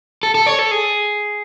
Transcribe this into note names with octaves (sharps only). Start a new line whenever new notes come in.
A4
A4
C#5
A4
G#4